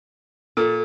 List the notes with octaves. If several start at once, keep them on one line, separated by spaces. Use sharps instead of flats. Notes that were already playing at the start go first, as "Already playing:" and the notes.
A#2 A4